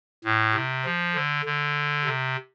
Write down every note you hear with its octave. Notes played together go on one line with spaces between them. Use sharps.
A2
C3
F3
D3
D3
C3